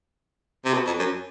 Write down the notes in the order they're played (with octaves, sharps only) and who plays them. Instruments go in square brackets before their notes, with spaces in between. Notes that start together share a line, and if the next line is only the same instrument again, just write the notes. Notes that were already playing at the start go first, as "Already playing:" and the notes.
[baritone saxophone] C3
B2
F2
F#2